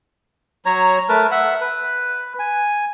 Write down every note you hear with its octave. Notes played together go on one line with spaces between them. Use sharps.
F#3 C#5 A#5
A3 A#4 B4 A5
E5 F#5
B4
G#5